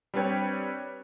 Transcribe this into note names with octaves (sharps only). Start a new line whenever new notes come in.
G3 C4 D4 B4 C#5 G5